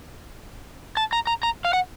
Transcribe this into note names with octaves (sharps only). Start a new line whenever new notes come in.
A5
A#5
A#5
A#5
F5
F#5